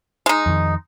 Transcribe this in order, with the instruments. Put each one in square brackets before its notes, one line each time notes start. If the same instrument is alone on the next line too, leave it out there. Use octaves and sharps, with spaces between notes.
[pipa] G#3 D#4
[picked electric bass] F2 D#3